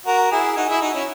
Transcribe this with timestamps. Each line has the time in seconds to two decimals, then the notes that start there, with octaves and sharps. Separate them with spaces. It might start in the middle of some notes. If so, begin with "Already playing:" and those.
0.06 F#4 A#4
0.31 E4 G#4
0.57 D#4 F#4
0.69 E4 G#4
0.82 D#4 F#4
0.94 C#4 E4